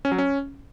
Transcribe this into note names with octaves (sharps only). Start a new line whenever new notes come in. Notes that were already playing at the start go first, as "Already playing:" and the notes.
C#4
F#3
C#4